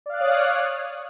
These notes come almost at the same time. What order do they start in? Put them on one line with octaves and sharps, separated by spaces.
D5 F5 F#6 D#6 C#5